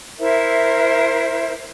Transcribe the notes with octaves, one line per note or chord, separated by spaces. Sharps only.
E4 A#4 C5 E5